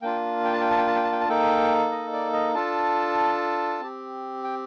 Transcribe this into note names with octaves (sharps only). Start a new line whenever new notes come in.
A#3 D4 F4 G5
G5
A5
G5
A5
G5
A5
G5
A5
G5
A5
A#3 D#4 A4 G5
D#5
D5
D#5
D4 F4 A4 A5
C4 G4
G5